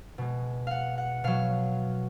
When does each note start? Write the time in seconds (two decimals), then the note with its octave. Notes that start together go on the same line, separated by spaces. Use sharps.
0.18 B2 G#3
0.67 F5 F#5
0.98 F#5
1.24 B2 F#3 F5